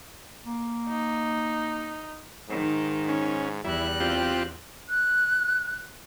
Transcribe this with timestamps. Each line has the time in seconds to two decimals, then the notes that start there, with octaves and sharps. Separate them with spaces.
0.45 A#3
0.89 D#4
2.49 G#2 D#3
3.09 C#4
3.64 E2 G3 E4 F#6
4.00 C4 F4 G4
4.89 F#6